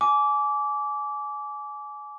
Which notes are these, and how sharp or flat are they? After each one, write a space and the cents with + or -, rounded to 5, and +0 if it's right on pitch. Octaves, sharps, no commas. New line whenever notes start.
G#5 +25 D6 -20